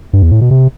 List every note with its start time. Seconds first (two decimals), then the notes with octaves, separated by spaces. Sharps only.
0.13 G2
0.22 E2
0.32 A2
0.41 B2
0.51 C3